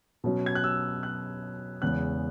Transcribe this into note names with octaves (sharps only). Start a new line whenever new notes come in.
B2 F#3 C#4
G#6
F#6
E6
F#6
E2 C#3 G#3 F#6